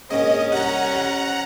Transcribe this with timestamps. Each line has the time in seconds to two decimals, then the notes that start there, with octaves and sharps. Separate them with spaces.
0.10 A#1 G#2 C#4 D#5
0.52 C2 F#5 A#5
0.93 F2